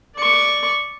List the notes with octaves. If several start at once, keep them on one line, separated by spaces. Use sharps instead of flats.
D5 C#6